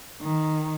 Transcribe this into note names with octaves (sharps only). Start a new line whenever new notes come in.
D#3